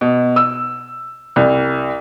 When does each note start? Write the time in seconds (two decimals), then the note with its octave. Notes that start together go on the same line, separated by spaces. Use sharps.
0.01 B2
0.36 E6
1.36 C2